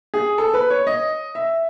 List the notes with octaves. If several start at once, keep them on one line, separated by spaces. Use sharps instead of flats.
G#4
A4
B4
C#5
D#5
E5